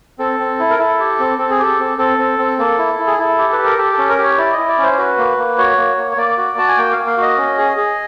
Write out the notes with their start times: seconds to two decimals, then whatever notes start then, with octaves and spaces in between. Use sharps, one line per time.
0.19 C4 A4
0.39 C4
0.59 E4
0.70 A#4
0.79 E4 A4
0.99 G4
1.19 C4
1.38 C4 A4
1.50 G#4
1.59 G4 A4
1.79 C4
1.98 C4 A4
2.18 C4
2.38 C4
2.58 A#3 A4
2.78 E4
2.99 E4
3.07 G#4
3.18 E4 A4
3.38 G4
3.53 B4
3.58 G4
3.65 A#4
3.78 G4 A4
3.93 A4
3.98 C#4
4.09 A#4
4.18 G4 C#5
4.38 E4 D5
4.53 E4 D#5
4.68 D5
4.78 C#4 C5
4.98 F#4 B4
5.18 A#3
5.38 A#3
5.58 F#4 C#5
5.77 A#3
5.97 A#3
6.11 C#5
6.17 A#3 D5
6.37 F#4
6.58 F#4 A5
6.68 G#5
6.77 A#3 G5
6.92 A#3 F5
7.07 F5
7.17 F#4 D#5
7.37 C#4
7.58 G#4
7.77 G#4